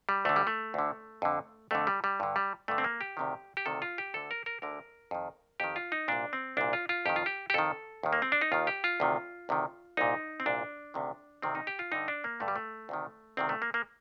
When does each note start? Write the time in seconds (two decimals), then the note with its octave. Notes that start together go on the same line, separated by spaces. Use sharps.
0.09 G3
0.25 D2 D3 A3
0.36 G3
0.47 A3
0.74 D2 D3
1.22 F2 D3
1.71 F2 D3 A3
1.87 G3
2.04 G3
2.20 G2 D3
2.36 G3
2.68 G2 D3 A3
2.78 C4
2.84 A#3
3.01 G4
3.17 D2 C3 D#3
3.57 G4
3.66 D2 C3 D#3 A4
3.82 F4
3.98 G4
4.14 D2 D3 A4
4.31 A#4
4.46 A#4
4.62 D2 D3 A#4
5.11 F2 D#3
5.60 F2 D#3 G4
5.76 F4
5.92 D#4
6.08 C2 A#2 D4
6.33 C4
6.57 C2 A#2 D4
6.73 F4
6.89 F4
7.06 F2 D#3 G4
7.16 F4
7.26 G4
7.50 G4
7.54 F2 D#3 A4
8.03 D#2 D#3
8.13 A#3
8.22 C4
8.32 D4
8.41 D#4
8.52 D#2 D#3 F4
8.67 G4
8.84 F4
9.00 D2 C3 D#3
9.49 D2 C3 D#3
9.97 C2 A#2 D#4
10.40 C4
10.46 C2 A#2 D4
10.94 D2 C3 D#3
11.42 D2 C3 D#3 C4
11.55 D#4
11.67 G4
11.79 F4
11.92 G2 D3 D#4
12.08 D4
12.24 A#3
12.40 G2 D3 A3
12.48 G3
12.56 A3
12.89 D2 C3 D#3
13.37 D2 C3 D#3 C4
13.49 A3
13.62 A#3
13.74 A#3